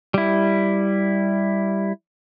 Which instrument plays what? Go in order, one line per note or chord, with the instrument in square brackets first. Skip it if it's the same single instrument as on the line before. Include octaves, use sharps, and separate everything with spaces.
[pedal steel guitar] G3 E4